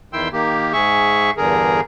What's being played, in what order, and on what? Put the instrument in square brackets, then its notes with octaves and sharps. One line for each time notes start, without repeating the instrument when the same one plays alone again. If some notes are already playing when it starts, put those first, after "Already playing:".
[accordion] E2 D#3 E4 G5 C6 E6
D#3 A#3 G4
G#2 G#4 E5 C#6
E2 G2 D3 G#4 A#4